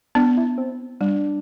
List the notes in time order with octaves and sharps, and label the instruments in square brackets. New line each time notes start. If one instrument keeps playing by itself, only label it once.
[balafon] B3 [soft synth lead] D4
[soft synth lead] E4
C4
[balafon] G3 [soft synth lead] D4